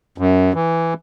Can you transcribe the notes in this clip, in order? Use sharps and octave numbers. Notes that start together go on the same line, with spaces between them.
F#2
E3